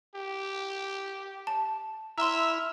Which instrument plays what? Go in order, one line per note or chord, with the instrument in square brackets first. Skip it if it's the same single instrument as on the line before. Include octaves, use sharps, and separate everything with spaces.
[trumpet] G4
[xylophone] A5
[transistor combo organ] E4 E6 F6 [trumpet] E5 [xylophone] A#5 C6